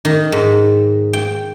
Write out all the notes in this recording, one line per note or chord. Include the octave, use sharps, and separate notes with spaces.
D#3
G#2
G5